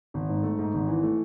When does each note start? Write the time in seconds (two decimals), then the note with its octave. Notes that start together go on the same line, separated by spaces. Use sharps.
0.14 G#1
0.29 G#2
0.43 A3
0.59 G#2
0.73 G#1
0.88 E3
1.03 A3